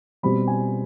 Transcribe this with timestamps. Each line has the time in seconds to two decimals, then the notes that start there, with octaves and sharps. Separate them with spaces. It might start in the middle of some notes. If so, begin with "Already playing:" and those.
0.23 B2 G3 C4 B5
0.47 G#5